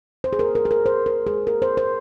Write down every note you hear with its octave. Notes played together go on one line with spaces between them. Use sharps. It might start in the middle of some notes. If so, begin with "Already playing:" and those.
C5
G#4
A#4
A#4
G#4
A#4
C5
A#4
G#4
A#4
C5
C5